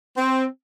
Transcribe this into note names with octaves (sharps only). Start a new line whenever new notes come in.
C4